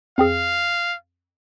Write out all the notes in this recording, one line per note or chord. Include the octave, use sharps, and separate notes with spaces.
F2 C4 G#4 F5